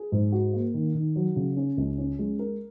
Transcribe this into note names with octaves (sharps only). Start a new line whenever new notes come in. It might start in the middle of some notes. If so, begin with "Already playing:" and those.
Already playing: G#4
G#2
F#4
A#3
D#3
D#3
F#3
C#3
C#4
C#2
C#4
G#3
A#4